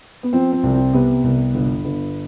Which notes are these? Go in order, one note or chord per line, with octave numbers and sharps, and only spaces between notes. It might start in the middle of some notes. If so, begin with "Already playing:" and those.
B3
F3 C4
C4
C2
C4
C3 B3
C2
G1
G1